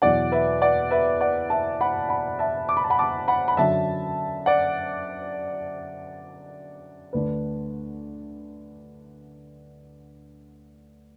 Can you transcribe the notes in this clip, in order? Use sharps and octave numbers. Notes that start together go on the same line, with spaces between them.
E2 B2 F#3 D5 F#5
B4 E5
D5 F#5
B4 E5
D5 F#5
E5 A5
F#5 B5
F#5 B5
E5 A5
D6
B5
A5
F#5 B5
A5 D6
F#5 B5
B5
F#2 D3 F#3 E5 A5
D5 F#5
D2 D3 A3 D4 B4